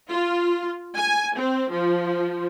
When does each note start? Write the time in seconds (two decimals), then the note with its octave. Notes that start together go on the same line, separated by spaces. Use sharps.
0.10 F4
0.97 G#5
1.38 C4
1.71 F3